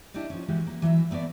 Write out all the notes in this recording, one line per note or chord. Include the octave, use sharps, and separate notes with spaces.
D4 E4 G4 D#5
F3 C#4
E3 G#3 A3 F#4 G4
A#3
E3 F#3 D#5 E5
G3 A3 B3 F#4 D5